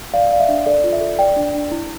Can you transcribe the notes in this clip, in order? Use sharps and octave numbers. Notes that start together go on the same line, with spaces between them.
D5 F5
D5 F5
E5
D4
A4 D5
F4
E5
A4
D5 G5
D4
D4
E4